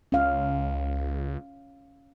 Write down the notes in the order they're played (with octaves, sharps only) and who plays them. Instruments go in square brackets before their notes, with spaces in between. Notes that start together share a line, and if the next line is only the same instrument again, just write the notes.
[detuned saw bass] C#2 [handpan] C#4 F5